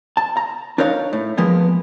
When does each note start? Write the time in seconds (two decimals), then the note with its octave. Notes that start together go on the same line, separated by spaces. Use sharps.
0.17 A5
0.37 A#5
0.78 D4 D#4 A#4 C#5 F5
1.13 A2
1.37 F3 G#3 A#3 B3